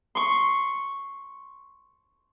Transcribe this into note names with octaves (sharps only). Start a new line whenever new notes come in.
C6 C#6